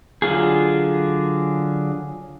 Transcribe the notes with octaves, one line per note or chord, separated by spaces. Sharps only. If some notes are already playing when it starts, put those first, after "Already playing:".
D3 F#3 F4 G#4